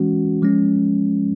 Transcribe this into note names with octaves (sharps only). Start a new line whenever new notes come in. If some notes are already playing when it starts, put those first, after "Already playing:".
Already playing: E3 G#3 C#4 F#4
F3 G#3 C#4